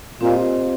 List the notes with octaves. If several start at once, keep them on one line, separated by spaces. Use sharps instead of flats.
A#2 C4 G4 C5 D#5